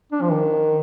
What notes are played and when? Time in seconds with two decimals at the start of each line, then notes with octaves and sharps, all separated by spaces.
0.12 D4
0.21 F3
0.31 D#3